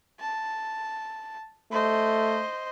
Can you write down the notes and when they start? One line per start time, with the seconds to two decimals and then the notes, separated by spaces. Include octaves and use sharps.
0.20 A5
1.72 A3 C5 D#5